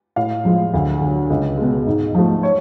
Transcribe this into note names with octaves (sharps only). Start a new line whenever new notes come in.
A2 F5
F3 G#3
D2
D3 F#3
C#2
B2 G#3
G#2
F3 A3
C#5